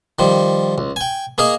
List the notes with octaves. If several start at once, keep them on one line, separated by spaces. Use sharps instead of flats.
D#3 F3 G3
C#2
G5 G#5
A#3 G#4 A#4 D#5 A#5